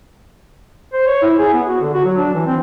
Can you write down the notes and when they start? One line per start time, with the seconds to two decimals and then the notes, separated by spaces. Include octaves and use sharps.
0.93 C5
1.07 C#5
1.22 E4
1.39 G#4
1.54 B3
1.67 F#4
1.81 D3
1.94 F#4
2.05 F#3
2.17 D4
2.34 E3
2.46 C4